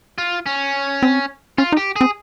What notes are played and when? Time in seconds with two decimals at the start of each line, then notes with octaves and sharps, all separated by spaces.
0.18 F4
0.46 C#4
1.03 C4
1.58 C#4 F4
1.72 D#4
1.77 G4
1.96 C4 G#4